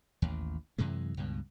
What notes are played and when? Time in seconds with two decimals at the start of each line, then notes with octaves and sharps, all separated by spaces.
0.22 A1 D#2
0.78 F#2 C3 E3 G#3
1.17 C#2 G2 B2